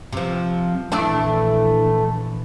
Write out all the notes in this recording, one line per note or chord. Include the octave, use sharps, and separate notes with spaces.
C3 F3
A#1 E3 A3 D4 E4 D5